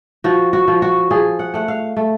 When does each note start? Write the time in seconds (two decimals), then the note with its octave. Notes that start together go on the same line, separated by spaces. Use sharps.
0.24 F3 F#4
0.53 F#4
0.68 F3
0.82 F#4
1.11 F3 G#4
1.39 F#5
1.54 A3 F#5
1.68 F5
1.97 A3